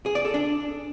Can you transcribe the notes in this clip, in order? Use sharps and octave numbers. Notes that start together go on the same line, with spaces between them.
G#4
D5
A4
D4